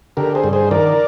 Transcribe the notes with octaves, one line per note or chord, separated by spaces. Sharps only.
D3 G4 A#4
G#4 C5
G2
G#4 C5
D#3 A#4 D5